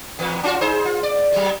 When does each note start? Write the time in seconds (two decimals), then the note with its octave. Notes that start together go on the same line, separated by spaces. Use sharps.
0.19 E2 B4
0.43 C#4 F4 F#4
0.61 D#4 G#4 C5
0.85 F4
1.03 D5
1.32 F#3 G#3